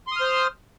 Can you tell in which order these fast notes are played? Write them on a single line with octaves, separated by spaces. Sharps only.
C6 D#6 F6 C5